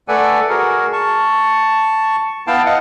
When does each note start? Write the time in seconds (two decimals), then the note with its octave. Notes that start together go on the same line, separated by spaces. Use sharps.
0.08 A3 A4 B4 D5 F#5 G#5
0.49 F#4 G#4 A#4
0.93 A5 C#6
2.47 B3 E4 F5 G5 A5
2.66 D#5 F5 F#5